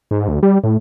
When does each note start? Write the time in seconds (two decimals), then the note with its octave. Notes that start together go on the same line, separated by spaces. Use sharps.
0.11 G#2
0.28 D2
0.43 G3
0.64 A2